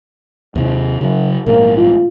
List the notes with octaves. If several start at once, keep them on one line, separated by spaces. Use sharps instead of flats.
D#2 G#2 C3
F#2 C#3 F#3
A#1 G#2 A#3
F4